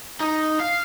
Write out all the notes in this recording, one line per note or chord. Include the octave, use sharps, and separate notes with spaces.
D#4
F5